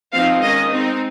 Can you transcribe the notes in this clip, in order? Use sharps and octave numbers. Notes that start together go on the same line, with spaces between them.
F3 C4 D#4 F5
D#3 G#3 C#4 D#5
G#3 C4 D#4